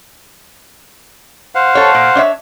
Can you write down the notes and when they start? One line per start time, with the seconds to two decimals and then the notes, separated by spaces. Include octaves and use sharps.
1.55 C5 F5 F#5
1.75 A4 C#5
1.95 A#2
2.15 D4 C#5 E5